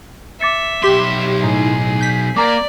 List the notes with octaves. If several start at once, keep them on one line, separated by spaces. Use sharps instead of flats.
E5 D6 A6 C#7
B1 G4 C6 B6 E7
A2 D#4 G#4
G6 B6
A#3 D5 A#5 D6